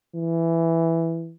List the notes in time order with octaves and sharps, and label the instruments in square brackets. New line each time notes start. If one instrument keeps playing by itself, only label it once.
[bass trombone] E3